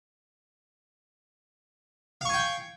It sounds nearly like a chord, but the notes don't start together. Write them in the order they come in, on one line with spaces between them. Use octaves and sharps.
F5 C#6 G#5 G5